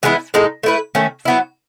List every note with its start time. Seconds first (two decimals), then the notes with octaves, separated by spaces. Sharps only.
0.03 E3 G#3 B3 E4
0.34 A2 G#3 D#4
0.63 A3 E4 B4
0.95 D#3 A3 C#4
1.25 F#3 B3 E4